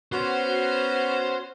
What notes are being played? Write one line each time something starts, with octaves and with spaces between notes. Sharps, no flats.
B3 C#4 F#4 C5